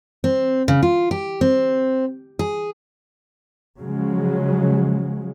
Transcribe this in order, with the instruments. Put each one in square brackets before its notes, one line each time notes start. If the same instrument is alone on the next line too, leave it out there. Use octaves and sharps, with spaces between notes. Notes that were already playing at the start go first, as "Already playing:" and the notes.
[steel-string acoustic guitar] C4
C#3
F4
G4
C4
G#4
[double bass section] C#3 F3 F#3 G#3